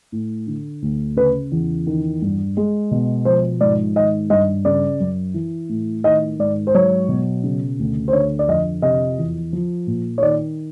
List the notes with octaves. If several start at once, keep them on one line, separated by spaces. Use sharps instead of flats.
A2
D3
D2
C#3 B4
E2
D#3
G2
G#3
B2
F3 C5
G#2 D5
D#3 D#5
G2 D#5
C#3 D5
F#2
E3
A2
D#3 D#5
G#2 D5
C5
F#3 C#5
B2
C#3
D2
C5
D3 C#5
D5
F2 D#5
C3 D#5
E2
F3
A#2
C#5
D#3 D5